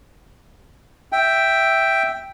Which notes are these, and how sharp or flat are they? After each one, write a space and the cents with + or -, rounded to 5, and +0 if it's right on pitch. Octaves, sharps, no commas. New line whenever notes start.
E5 +0 G5 +0